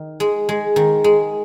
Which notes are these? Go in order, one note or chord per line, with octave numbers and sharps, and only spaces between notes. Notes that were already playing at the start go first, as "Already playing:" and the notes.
Already playing: D#3
G#3
G#3
D#3
G#3